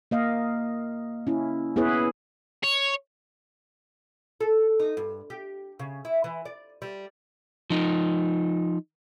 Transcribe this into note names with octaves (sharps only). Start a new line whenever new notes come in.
A#3 D#5 F5
C#4 E4
B3 E4 G#4 B4 C#5
C#5
A4
D#4
G2
G4
C#3
E4
E3
D5
G3
F3 D#4